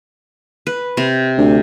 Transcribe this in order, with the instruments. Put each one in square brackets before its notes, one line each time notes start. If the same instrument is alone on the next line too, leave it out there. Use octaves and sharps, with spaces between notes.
[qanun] B4
C3
[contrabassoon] D2